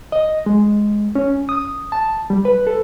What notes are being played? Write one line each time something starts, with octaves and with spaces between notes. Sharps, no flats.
D#5
G#3
C#4
D#6
A5
G3
B4
A4